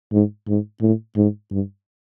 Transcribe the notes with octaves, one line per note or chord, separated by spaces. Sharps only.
G#2
G#2
A2
G#2
G2